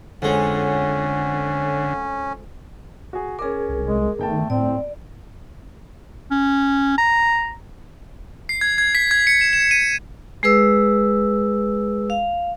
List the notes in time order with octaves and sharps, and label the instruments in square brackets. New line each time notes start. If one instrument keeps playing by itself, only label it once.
[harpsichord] F2 G#3 [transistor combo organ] D3 [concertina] C#4 [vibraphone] C#5 F#5
[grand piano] F#4 G#4
[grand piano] C#4 D6 [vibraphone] G#4 A#4
[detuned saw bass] C2
[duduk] G#3
[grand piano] G1 G5 A5 [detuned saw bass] D#3 [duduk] A3
[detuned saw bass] A2 [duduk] C4 [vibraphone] D5
[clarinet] C#4
A#5
[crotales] C7
G#6
G#6
B6
G#6
C#7
E7
E7
D#7
[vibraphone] G#3 G#4 B4 E6
F5